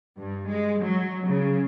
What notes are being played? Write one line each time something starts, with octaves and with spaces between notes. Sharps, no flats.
G2
G#3
F#3
C#3